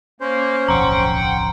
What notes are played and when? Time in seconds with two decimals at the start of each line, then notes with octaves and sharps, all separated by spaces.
0.21 A#3 C#4 C5
0.68 D1 B1 F2 F#5 G5 A#5 C6